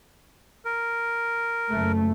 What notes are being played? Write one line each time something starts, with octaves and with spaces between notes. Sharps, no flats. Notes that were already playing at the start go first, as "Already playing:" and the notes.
A#4
F#1 A3